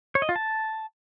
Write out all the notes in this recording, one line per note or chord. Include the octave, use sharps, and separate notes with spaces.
C#5
D#5
F4
A5